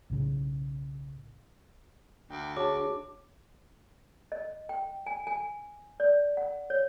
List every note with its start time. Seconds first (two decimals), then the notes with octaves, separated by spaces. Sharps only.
0.10 B1 A2 C#3
2.30 D2 G5
2.57 D4 F#4 G#4 C#5 A5 D6
4.32 D#5
4.69 G5
5.06 G#5
5.27 G#5
6.00 D5
6.37 F#5
6.70 C#5